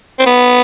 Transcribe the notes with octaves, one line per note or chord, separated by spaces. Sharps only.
C4
B3